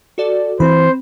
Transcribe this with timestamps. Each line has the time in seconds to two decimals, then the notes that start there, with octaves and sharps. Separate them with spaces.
0.18 F#4 A4 D5
0.60 E3 C4 C5 B5